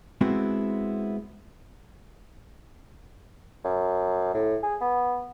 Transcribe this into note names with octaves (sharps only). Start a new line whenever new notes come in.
G#3 B3 C4 E4 F#4
F#2
A2
G#4
B3